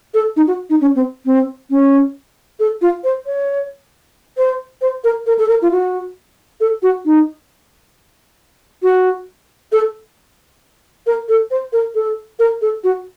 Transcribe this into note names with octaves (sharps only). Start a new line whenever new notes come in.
A4
D#4
F#4
D#4
C#4
C4
C4
C#4
A4
F4
C5
C#5
C5
C5
A#4
A#4
A4
A#4
F4
F#4
A4
F#4
D#4
F#4
A4
A#4
A4
C5
A#4
A4
A#4
A4
F#4